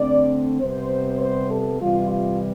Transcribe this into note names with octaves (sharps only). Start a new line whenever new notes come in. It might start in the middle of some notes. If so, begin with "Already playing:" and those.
Already playing: D3 A3 C4 D5
C3 G3 B3 C5
C5
A4
C3 E3 G3 F4
F4